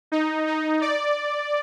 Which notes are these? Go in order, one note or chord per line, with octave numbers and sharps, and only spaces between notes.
D#4
D#4
D5